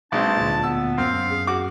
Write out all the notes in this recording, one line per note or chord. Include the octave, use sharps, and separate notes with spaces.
B1 G#3 C4 D4 A5
D2 A#2
B3 E6
F#2 C4 F5
G#4
F#4 D6